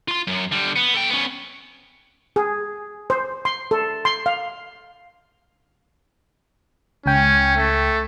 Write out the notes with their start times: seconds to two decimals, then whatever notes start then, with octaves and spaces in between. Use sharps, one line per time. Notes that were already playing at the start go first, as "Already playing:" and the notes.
0.08 F4 C6
0.27 F#2
0.52 D3 G3
0.76 B3
0.94 A4 G5
1.10 B3 C#4
2.36 G#4
3.10 C5
3.45 C6
3.71 A4
4.05 C6
4.26 F5
7.06 C#2 C#4 G5
7.56 A3